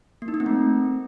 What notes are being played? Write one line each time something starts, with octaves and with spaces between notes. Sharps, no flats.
A#3
D#4
A#3
C4
A3